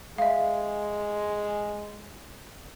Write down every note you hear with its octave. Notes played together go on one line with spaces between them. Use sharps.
G#3 E5 F5